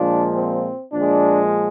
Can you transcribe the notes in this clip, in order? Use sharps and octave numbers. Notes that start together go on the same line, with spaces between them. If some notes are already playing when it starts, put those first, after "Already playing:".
Already playing: A#2 F3 G#3 D4
C4
A#2 F3 G#3 D4